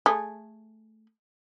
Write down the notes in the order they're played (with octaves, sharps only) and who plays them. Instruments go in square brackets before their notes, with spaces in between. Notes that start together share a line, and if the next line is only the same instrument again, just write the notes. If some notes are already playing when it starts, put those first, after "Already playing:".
[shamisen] A3 G#4